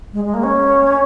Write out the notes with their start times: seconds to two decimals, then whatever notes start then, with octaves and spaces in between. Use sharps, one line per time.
0.12 G#3
0.23 G#3
0.33 A#3
0.43 C#4